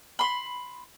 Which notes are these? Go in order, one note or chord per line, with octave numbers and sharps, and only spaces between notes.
B5 C6